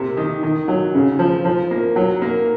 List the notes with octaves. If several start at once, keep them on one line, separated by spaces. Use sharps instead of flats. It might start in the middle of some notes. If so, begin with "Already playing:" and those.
Already playing: C3 A#3
D#3
D#3
F#3
C#3
F3
F3
A#3
F#3
A#3